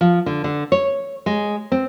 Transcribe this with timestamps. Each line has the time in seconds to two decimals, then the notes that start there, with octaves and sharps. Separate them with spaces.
0.01 F3
0.26 D3
0.44 D3
0.72 C#5
1.26 G#3
1.72 C4